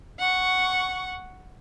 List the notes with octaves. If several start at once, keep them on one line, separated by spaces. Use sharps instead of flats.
F#5 C#6